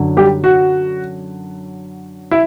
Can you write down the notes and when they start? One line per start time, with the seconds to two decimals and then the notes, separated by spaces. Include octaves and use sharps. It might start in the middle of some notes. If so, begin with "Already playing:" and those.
Already playing: F#2 D3 F#3
0.17 G3 G4
0.44 F#4
2.31 E4